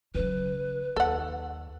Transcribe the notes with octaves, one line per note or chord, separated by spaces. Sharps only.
C#3 F#3 B4
D#2 A4 F#5